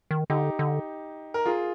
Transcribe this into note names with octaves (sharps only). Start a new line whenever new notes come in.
D#3
D3 D#4 G4
D3
A#4
F4 G#4